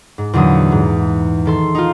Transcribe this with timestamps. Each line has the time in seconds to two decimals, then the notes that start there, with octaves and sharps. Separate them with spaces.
0.18 G#2
0.33 E2 A#2 D3 F#3 D#6
0.72 G#2
1.45 D#3 A4 C6
1.75 D#4 F4